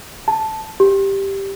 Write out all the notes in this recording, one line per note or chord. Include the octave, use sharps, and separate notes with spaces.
A5
G4